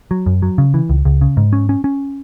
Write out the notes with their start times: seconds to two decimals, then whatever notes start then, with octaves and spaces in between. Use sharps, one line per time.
0.11 F#3
0.26 F#2
0.42 F#3
0.58 C#3
0.74 E3
0.89 C#2
1.05 C#2
1.21 C#3
1.37 G#2
1.53 C#4
1.69 C#4
1.84 C#4